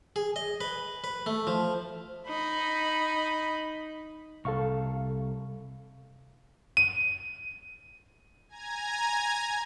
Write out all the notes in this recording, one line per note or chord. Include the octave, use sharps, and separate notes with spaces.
G#4
D#5
B4
B4
A3
F3
D#4 B5
C2 A4 F5 C#6
D#7
G#5 A#5 G#6